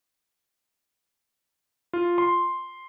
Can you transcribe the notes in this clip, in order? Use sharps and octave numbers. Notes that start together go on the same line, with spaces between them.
F4
C6